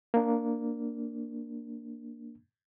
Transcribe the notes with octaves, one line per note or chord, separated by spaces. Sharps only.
A#3 D4